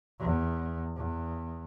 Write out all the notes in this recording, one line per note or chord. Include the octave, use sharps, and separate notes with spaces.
E2
E2